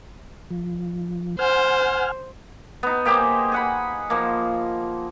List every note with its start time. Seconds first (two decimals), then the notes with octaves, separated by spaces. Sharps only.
0.51 F3
1.39 C5 F#5 G#5 F6
2.83 B3 D#4
3.05 A#3 G4 G#4 C5
3.52 G#4 F#5 B5
4.10 F3 A#3